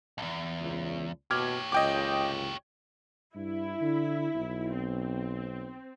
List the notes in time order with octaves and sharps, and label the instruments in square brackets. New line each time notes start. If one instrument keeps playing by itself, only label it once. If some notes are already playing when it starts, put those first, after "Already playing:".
[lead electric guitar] B1 E2
[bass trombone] C#2
[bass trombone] B2 [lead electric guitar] G4 C#5 [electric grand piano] D6 F6 G#6
[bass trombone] C#2 [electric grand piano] D#5 G5 D6
[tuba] G2 [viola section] E4
[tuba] D3
B1
[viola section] C4